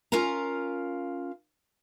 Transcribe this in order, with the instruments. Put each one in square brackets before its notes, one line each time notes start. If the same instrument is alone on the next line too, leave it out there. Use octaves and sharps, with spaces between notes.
[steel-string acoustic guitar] C#4 F4 A#4 F5 A#5